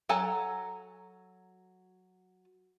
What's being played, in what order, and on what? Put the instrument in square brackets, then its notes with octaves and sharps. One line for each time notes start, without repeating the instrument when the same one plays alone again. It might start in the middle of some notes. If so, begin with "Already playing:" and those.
[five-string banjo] F#3 A4 F#5 G#5 A#5